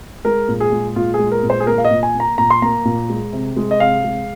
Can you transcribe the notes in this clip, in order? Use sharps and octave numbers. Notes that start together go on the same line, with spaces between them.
G#3 A#4
A#2
G#4
G#3
A#2 F4
G#4
G#3
A#4
A#2
C5
G#4
A#3 A#4
F5
D#5
A#2
G#5
A#3
A#5
A#2 A#5
C6
A#3 A#5
A#2
G#3
C3
G#3
D#5
C3 F5
G#3